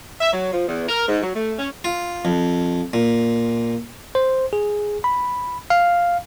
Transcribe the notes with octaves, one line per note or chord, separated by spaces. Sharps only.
E5
F#3
F3
E2
A#4
G#2
F#3
A3
C#4
F4
F2
A#2
C5
G#4
B5
F5